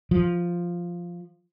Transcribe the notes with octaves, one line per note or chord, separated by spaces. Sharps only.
F3